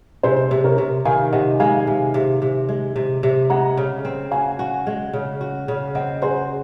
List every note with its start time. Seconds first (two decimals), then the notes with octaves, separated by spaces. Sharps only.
0.23 C3 G#4 C5
0.51 C3
0.64 A#4 C#5
0.78 C3
1.05 D#3 F5 G#5
1.32 C3 D#5 F#5
1.60 G#3 F5 G#5
1.87 C3
2.14 C3
2.42 C3
2.69 G#3
2.96 C3
3.23 C3
3.50 G#3 F#5 A#5
3.77 C#3
4.05 C4
4.31 F#4 F5 G#5
4.59 F#4
4.87 G#3
5.13 C#3
5.41 F#4
5.68 C#3
5.95 C4 D#5 F#5
6.22 F#4 G#4 C5